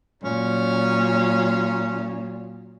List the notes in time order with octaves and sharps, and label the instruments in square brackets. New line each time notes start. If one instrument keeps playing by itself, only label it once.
[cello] A#2 F#3 [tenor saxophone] C#4